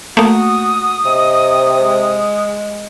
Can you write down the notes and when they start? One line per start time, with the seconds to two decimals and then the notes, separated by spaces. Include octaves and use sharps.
0.17 A3 A#3 F#4 D#6
1.05 C3 D#5
1.80 G#3